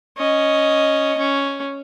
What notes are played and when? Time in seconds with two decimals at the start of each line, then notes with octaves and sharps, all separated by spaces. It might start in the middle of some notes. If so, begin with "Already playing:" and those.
0.18 C#4 D#5
1.17 C#4